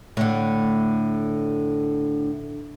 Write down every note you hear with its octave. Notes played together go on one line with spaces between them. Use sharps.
A2 D3